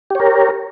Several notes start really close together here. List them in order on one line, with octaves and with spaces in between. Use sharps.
G4 C#5 A#4